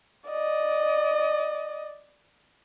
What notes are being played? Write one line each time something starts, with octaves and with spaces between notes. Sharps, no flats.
D5 D#5